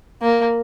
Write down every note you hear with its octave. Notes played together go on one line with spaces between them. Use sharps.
A#3